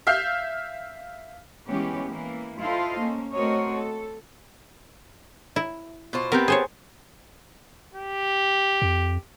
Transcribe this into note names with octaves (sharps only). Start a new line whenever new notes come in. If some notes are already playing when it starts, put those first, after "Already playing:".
E5 F5 F6 G6 C7
E3 G#3 B3 C#4 G4
E3 A#3
E4 F4 A4 C5 D#5 F5
A#3 C#4
A3 C4 F#4 A#4 C#5 D#5
A4
E4
B2 F4 C5
B3 C4 G4 A#4
G#4 C5 C#5
G4
F2